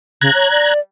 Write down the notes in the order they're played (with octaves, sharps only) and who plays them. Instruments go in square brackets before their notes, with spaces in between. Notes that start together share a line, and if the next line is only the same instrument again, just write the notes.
[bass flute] C#3 [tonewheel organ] A#5 F#6 G#6
[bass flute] C#5
D5